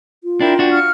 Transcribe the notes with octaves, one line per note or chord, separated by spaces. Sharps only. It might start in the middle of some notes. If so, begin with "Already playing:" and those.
F4
D4 E4 A#4 G5 C6
D4 F#4 G5
F5 C#6 F6